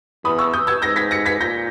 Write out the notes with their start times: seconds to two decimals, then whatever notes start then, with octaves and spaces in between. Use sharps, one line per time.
0.24 E2 B5 D#6
0.38 C#6 E6
0.53 D#6 G6
0.67 E6 G#6
0.82 G#2 G6 A#6
0.96 G#6 B6
1.11 A#6 C#7
1.26 G#6 B6
1.40 A#2 G6 A#6